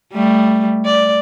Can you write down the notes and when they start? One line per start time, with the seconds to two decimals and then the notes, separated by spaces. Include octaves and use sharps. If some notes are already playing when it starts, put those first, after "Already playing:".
0.13 G3 A3
0.85 D5